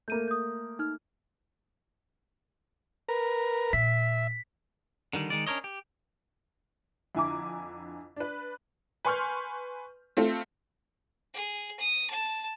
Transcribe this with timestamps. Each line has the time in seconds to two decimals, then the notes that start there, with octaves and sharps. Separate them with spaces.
0.08 A3 A#3 G6 D#7
0.28 D#6 G6
0.79 D#4 F6
3.09 A#4 B4 A#5
3.73 A#2 E5 B6
5.13 D3 D#3 G3
5.30 D#3 G#3 D5
5.47 C#4 D4 A#4 C#5 D#5
5.64 G4
7.15 F2 D3 E4 G#5 A#5 D6
8.16 D4 B4
9.05 B4 G#5 C6 C#6 F6 G6
10.17 A3 C4 F4 A4
11.34 G#4
11.79 D#6
12.10 A5